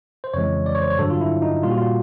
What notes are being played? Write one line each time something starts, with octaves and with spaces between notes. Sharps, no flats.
C5
F2 C#3 E3 G#3 C#5
D5
C#5
C5
C#5
G2 D3 F#3 A4
F4
E4
D#4
A#2 G3 F4
F#4
F4